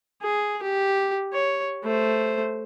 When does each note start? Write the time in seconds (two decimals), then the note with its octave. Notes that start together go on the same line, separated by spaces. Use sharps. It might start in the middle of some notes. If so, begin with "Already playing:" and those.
0.22 G#4
0.62 G4
1.33 C#5
1.83 A3 C5